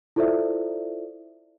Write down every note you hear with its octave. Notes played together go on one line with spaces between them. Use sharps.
E4 F4 A4 C5 D5 E5